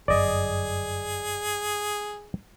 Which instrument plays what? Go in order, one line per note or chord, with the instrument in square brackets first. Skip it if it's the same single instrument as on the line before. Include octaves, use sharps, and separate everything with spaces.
[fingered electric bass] G1 F#2 [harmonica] G#4 [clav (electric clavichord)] D5 D#5